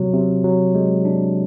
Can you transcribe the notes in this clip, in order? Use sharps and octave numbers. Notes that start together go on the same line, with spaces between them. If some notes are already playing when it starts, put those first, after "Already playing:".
Already playing: C3 F#3
C3
F#3
G#3
D4